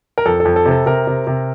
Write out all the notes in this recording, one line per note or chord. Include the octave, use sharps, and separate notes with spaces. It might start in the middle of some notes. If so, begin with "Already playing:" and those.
A#4
F2 A4
A4
F2
A4
C3
A4
C3 A#4
C3
C3